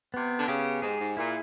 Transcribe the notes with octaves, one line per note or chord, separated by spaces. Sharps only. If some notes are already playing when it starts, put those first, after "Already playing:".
C3 B3
D3
C#3 G4
G#2 G#4
G#2
A#2 E4